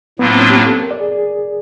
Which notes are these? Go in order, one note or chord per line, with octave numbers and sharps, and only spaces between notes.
A2 F#3 A#3 B3 D4 F4
C4
C#4
G4
A4
A#4
D5
G#4
G#4